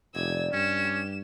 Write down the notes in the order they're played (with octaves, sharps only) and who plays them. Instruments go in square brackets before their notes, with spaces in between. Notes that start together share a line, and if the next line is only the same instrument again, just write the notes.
[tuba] F1 [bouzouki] C3 D#4 D5 [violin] E6 G#6
[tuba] G2 [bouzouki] G3 [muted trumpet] C#4 [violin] E7
[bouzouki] G4 B4